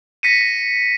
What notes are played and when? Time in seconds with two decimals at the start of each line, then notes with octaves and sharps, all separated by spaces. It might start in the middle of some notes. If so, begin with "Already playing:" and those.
0.23 A#6 B6 C#7 D#7
0.41 A#6